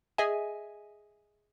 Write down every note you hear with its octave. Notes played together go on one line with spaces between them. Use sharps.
G#4 D#5 E5 G#5